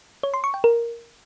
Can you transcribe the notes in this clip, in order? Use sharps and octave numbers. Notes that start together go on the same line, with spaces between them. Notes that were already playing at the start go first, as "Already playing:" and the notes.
C#5
C6
C#6
G5
A#4